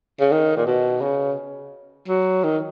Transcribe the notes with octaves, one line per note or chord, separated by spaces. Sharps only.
C#3
D#3
A#2
B2
C#3
F#3
D#3